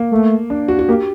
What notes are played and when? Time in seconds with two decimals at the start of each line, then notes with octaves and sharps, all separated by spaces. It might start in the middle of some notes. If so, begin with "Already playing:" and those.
Already playing: A#3
0.12 A3
0.50 D4
0.68 F#4
0.79 F#4
0.88 A#3 G4